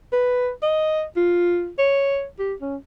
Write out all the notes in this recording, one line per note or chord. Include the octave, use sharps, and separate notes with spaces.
B4
D#5
F4
C#5
G4
C#4